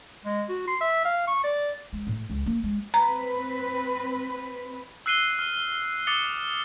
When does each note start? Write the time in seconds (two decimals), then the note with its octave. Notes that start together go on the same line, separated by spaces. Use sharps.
0.25 G#3
0.49 F#4
0.68 C6
0.81 E5
1.05 F5
1.28 C#6
1.44 D5
1.93 G#3
2.07 A2
2.30 C#2
2.46 A#3
2.64 G#3
2.94 C4 B4 A#5
5.06 E6 F#6 C7 D#7 G7
5.39 F6 D#7
6.07 D6 D#6 A6 C#7 G7